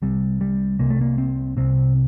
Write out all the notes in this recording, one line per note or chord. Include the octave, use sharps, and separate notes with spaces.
C2 C3 G3
G3
C2 C3 A#3
A3
A#3
C4
C2 C3 C4